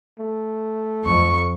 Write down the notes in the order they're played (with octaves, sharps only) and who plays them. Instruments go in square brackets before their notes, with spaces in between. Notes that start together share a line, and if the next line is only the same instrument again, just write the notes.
[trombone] A3
[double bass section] F2 [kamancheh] C#6